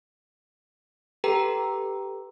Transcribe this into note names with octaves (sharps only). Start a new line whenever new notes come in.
G4 A4 B4 G5 A#5